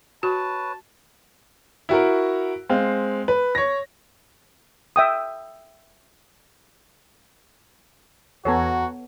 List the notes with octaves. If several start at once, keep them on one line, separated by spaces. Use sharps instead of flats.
F#4 B4 C#5 A5
E4 F#4 A#4
G#3 C4 F5
B4
C#5 A#6
E5 G5 D#6
E2 B3 F#4 A4 C#5 G#5 A#5